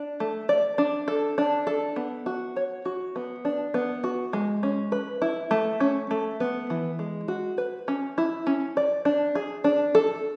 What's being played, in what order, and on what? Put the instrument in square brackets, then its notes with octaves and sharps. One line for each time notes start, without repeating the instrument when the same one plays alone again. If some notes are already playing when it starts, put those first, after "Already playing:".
Already playing: [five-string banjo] D4
A3
D5
D4
A4
D4
A4
B3
F#4
C#5
F#4
B3
D4
B3
F#4
G#3
C#4
B4
E4
A3
C#4
A3
B3
E3
G#3
F#4
B4
C#4
E4
C#4
D5
D4
G#4
D4
A4